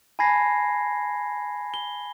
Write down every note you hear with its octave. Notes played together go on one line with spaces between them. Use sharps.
G#5 A5 B5 G#6 A#6 C7
G7